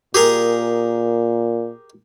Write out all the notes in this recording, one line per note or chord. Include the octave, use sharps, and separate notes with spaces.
A#2 G4 G#4 A#4